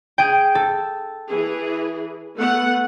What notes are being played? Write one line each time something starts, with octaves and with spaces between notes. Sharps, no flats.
G#4 G5
A4
E3 G#4
A3 B3 F#5